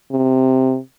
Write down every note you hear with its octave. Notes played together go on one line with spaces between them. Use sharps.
C3